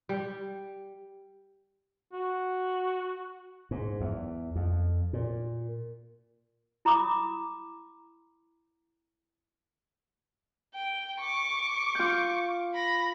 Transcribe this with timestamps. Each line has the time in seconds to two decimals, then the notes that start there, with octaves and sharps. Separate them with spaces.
0.09 G3
2.13 F#4
3.71 G#2
4.00 E2
4.56 F2
5.13 A#2
6.85 E4 A#5 B5 D6 D#6
10.74 G5
11.20 C#6 D6
11.95 F4 G6
12.74 B5 A#6